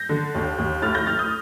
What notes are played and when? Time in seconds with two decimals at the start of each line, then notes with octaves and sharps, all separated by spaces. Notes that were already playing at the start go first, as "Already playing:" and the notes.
Already playing: G6 A#6
0.09 D3
0.35 D#2
0.58 D#2
0.82 A2 F6 A6
0.94 G6 A#6
1.06 A2 F6 A6
1.19 D#6 G6